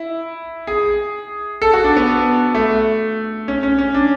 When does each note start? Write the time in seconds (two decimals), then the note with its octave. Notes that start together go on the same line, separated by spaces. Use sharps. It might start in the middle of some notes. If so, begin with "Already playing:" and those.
Already playing: E4
0.67 G#4
1.62 A4
1.73 F#4
1.84 D4
1.96 B3
2.55 A3
3.48 C#4
3.63 C#4
3.78 C#4
3.94 D4